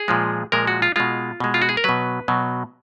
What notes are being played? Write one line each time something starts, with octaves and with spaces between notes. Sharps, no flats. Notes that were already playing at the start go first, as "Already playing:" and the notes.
Already playing: G#4
A#2 F3 G#3
A#2 F3 G#3 A#4
F#4
F4
B2 G#3 F4
B2 G#3
F4
F#4
G#4
A#4
B2 F#3 B4
B2 F#3